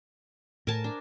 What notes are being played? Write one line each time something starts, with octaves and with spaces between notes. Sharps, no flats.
A2 A#4 G#5 A5
D4